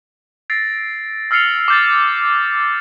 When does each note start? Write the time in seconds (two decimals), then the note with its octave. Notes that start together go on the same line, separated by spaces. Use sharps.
0.50 E6 A6 A#6 C7 D7
1.31 E6 F6 A6 C7 C#7 F7
1.68 D6 G6 A6